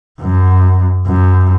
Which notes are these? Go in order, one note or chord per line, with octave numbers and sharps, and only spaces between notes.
F#2
F#2